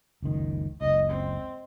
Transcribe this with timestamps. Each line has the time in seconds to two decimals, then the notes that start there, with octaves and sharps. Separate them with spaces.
0.22 F#1 C#2 D#3
0.81 F#1 C#2 D#5
1.10 C4